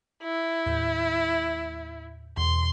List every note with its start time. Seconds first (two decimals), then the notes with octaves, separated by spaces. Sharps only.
0.23 E4
0.66 D#2 A2 G6
2.37 E2 B2 C6